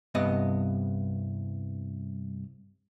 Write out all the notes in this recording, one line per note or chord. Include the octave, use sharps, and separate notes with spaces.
C2 G2 B3 D#5